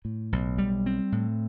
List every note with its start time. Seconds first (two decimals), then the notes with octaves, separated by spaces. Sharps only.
0.05 A2
0.32 B1
0.58 G3
0.86 C4
1.12 A2